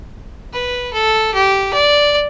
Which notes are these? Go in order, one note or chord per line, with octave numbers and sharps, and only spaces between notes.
B4
A4
G4
D5